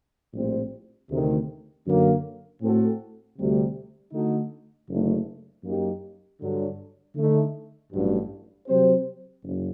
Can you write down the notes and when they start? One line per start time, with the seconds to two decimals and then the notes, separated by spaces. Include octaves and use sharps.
0.34 A#1 A2 G3 C4
1.10 D2 C3 D#3
1.86 F#2 D3 F#3 A#3
2.61 A2 A3 C4 F#4 A4
3.37 D2 C3 G3
4.13 D3 A3 D#4 F#4 A4
4.89 F#1 F#2 D3 A3 D#4
5.64 F#2 F#3 A#3 D#4 G4
6.40 G2 D3 F#3
7.16 D3 A3 D#4
7.91 A1 G2 F#3
8.67 C3 F#3 C4 G4 C5
9.43 F#1 F#2